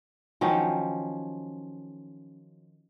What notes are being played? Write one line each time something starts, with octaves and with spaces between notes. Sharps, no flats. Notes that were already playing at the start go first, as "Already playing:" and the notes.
D#3 F3 F#3 C#4